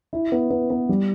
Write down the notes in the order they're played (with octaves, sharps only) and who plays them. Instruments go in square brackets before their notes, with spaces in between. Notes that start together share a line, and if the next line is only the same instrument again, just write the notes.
[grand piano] E4
B3
B3
B3
G3